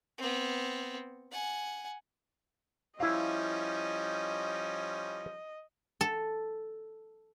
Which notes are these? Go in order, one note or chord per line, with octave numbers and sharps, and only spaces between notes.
B3 C4
F#5 G#5
F3 G3 C#4 E4 D#5 F5
A4